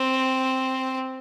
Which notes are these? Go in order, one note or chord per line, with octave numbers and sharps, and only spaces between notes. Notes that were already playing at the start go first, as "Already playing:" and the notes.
Already playing: C4